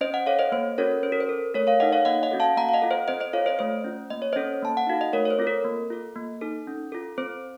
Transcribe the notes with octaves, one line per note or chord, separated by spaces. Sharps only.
C#4 C5 D#5
D#5 F#5
A4 C#5 F5
C5 D#5
A#3 C5
C#4 F#4 A4 A#4 C#5
C#4 C5
A#4
C5
A4
A3 A#4 C#5
C#5 F5
D#4 A4 D#5 F#5
C#5 F5
A#3 D#5 F#5
D#5 F#5
C#4 F#4 A4
F5 A5
A#3 F#5 A#5
F5
D#5 F#5
F4 A4
C5 D#5
C4 C5 D#5
C5 D#5
F4 A4 C#5 F5
C5 D#5
A3 C5
C#4 F4
A#3 D#5
C#5
C#4 A4 C5 D#5
A#3 A5
F#5
D#4 F#4 A4 F5
D#5
A3 A#4 C#5
C#5
C5
C4 F4 A4
A#4
A#3
F4 A4
A#3
D#4 A4
C#4
F4 A4
C4 C5